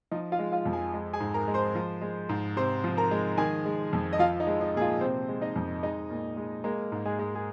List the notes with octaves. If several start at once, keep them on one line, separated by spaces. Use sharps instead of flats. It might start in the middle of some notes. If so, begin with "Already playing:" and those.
F3 D#4
F4 F5
G#3
F4 F5
F2
G#4 G#5
G#3
G#4 G#5
G#2
A#4 A#5
G#3
C5 C6
F3
G#3
G#2
C3 C5 C6
F3
A#4 A#5
G#3
D#3 G#4 G#5
G#3
F2
D#5
F3 F4 F5
D#4
G#3
D#4
A#2 G#4
F4
C3 C4 C5
G#3
D#4 D#5
F2
G#3 D#4 D#5
A#2
G#3
G#3 A#3 A#4
G#2
G#3 G#4
G#3
G#4